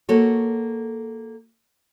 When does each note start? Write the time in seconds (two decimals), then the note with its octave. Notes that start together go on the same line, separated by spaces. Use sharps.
0.09 A#3 F#4 A4 C#5